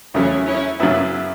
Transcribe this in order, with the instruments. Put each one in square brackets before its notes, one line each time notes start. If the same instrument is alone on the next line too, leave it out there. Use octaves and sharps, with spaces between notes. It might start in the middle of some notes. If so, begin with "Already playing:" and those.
[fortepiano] E2 C#3 F#3 A3 [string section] C#4 E4
[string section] C#4 E4
[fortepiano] F#2 C#3 F#3 B3 E4